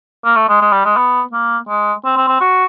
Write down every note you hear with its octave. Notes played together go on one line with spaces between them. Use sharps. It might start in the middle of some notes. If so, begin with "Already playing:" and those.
A#3
A3
G#3
G#3
G3
G#3
B3
A#3
G#3
C4
C4
C4
F#4